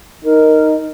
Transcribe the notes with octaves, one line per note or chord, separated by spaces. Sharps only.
D#4 A#4